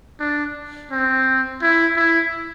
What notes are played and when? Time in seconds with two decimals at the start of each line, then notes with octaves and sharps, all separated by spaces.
0.20 D4
0.91 C4
1.62 E4
1.96 E4